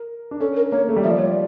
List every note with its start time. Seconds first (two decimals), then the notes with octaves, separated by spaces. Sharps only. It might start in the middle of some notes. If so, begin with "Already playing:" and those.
Already playing: A#4
0.31 D4
0.40 C#4 A4
0.56 A#4
0.72 A#3 C#5
0.89 A3
0.96 G3
1.04 F3 E5
1.11 D5
1.14 G3 C#5
1.26 D5